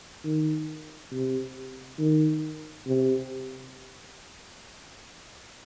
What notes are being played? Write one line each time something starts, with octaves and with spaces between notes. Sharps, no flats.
D#3
C3
D#3
C3